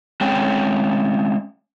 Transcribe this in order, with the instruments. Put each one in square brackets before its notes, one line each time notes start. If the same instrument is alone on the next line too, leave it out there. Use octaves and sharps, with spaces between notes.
[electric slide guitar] G#3 C4 C#4 G5